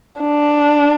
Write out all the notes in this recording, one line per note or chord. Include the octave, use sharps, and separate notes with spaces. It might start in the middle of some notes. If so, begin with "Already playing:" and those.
D4